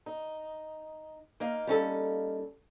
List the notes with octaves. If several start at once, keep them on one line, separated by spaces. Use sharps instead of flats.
D#4
A#3 D#4 F5
G3 C#4 A4